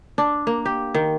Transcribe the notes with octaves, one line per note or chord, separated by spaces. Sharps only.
D4
A#3
G4
D#3